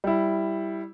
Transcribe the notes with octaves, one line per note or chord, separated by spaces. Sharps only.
G3 E4